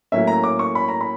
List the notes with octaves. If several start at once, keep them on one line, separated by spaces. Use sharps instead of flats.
A2 F#3 A#3 C#4 E5
A#5
D6
C#6
B5
A#5
B5